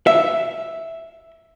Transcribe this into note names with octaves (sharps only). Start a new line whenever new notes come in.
E5